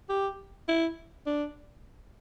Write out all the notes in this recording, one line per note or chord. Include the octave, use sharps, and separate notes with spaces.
G4
E4
D4